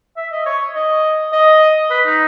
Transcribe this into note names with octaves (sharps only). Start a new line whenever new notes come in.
E5
D#5
C#5
D#5
D#5
B4
D#4